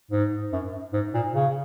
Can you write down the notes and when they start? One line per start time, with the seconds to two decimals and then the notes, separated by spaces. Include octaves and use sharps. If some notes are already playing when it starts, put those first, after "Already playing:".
0.11 G#2
0.53 F#2
0.93 G#2
1.14 A#2
1.34 C#3